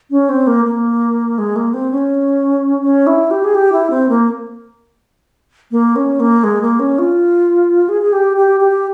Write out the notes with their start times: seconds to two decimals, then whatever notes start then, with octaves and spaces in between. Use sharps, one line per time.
0.11 C#4
0.29 C4
0.47 A#3
0.65 A#3
1.38 G#3
1.56 A#3
1.74 C4
1.91 C#4
2.82 C#4
3.07 E4
3.31 G4
3.44 G#4
3.55 G4
3.72 E4
3.90 C4
4.09 A#3
5.71 A#3
5.96 C#4
6.20 A#3
6.44 G#3
6.62 A#3
6.80 C#4
6.99 F4
7.89 G#4
8.02 G#4
8.13 G4
8.37 G4
8.61 G4